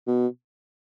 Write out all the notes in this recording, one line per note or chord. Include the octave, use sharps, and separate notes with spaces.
B2